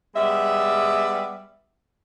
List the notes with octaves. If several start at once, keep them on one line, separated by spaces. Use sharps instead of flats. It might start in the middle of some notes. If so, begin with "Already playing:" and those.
G3 G#3 B3 E5